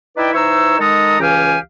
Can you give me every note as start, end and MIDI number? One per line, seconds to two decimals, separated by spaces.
0.17 0.31 63
0.17 0.31 64
0.17 0.31 71
0.17 0.31 74
0.17 0.31 76
0.17 0.31 79
0.34 0.78 52
0.34 0.78 63
0.34 0.78 72
0.34 0.78 73
0.34 0.78 88
0.79 1.18 51
0.79 1.18 56
0.79 1.18 63
0.79 1.18 69
0.79 1.18 82
0.79 1.18 87
1.20 1.57 37
1.20 1.57 52
1.20 1.57 61
1.20 1.57 67
1.20 1.57 77
1.20 1.57 80